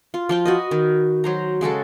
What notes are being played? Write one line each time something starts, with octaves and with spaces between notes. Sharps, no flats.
F4
F3 F4 G5
F#4 B4 D#5
D#3
F#3 C5 A#5
C#3 G#3 F#4 A4